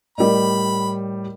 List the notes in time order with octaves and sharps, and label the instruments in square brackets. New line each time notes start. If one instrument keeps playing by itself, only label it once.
[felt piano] A2 G3 [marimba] A#4 D5 D#5 [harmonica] B5